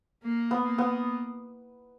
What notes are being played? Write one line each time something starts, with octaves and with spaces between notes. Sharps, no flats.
A#3
B3
A#3
B3